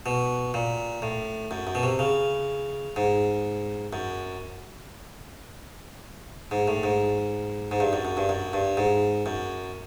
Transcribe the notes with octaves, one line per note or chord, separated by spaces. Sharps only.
B2
A#2
A2
F#2
F#2
B2
C3
C#3
G#2
F#2
G#2
A2
G#2
G#2
G2
F#2
F#2
G2
F#2
G2
G#2
F#2